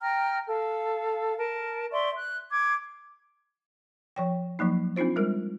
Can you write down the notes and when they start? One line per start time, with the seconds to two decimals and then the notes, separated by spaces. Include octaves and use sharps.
0.01 G5 A#5 F6
0.48 A4 F5
1.37 A#4 A5
1.92 D5 E5 C6 C#6
2.16 F#6
2.51 D6 G#6
4.16 F3 C#5 G5
4.59 F3 F#3 A#3 D#4
4.96 C4 D4 D#4 F4 C5
5.16 G3 G#3 A#4